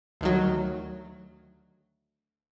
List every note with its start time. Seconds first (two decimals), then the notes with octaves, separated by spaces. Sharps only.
0.21 D2 D#3 F#3